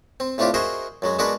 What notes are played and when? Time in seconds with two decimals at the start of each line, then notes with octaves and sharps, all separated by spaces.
0.20 C4
0.38 A2 A3 C4 D4 F4 G4
0.54 F#4 G#4 A#4 C5 D#5 E5
1.02 F#2 F#3 G#3
1.19 G#3 B3 D4 F#4 A#4 B4